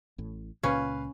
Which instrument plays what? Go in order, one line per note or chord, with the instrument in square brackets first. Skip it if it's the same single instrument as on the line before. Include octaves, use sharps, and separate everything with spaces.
[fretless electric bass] A1 A2
[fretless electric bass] C#2 A#2 C#3 [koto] C#4 [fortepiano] B4 F5